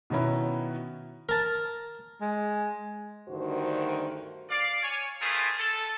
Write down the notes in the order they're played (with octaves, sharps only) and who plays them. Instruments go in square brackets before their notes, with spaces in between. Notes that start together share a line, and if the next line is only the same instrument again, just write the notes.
[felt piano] B2 D#3 B3 C#4 E4
[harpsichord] A#4 A5
[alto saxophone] G#3
[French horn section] D2 G2 D3 D#3 F#4 C5
[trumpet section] D5 F5
C#5 G#5
A3 E4 F4 G#4 A#4 C5
A4